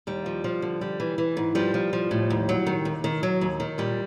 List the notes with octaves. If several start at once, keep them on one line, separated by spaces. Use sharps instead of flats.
D#2 G3
F3
F3
D3
G3
E3
E3
G#2
F3 G3
F3
F3
A2
D#2
F#3
D#3
D#2
D#3
F#3
D#2
D#3
A#2 G3